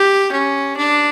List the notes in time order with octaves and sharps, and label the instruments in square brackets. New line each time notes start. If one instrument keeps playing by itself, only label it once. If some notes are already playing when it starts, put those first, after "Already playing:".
Already playing: [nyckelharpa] G4
C#4
D4